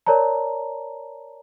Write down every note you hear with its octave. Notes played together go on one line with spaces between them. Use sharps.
A#4 C#5 D5 A5 A#5